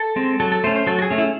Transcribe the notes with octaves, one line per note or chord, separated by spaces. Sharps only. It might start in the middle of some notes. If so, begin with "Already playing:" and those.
Already playing: A4
G#3 C4
F#3 A4
A4
A3 C#4 C5
C5
F#3 A4
F#4
G#4
A3 C#4
E4